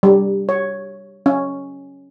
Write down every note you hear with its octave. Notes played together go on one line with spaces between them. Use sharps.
G3
C#5
C#4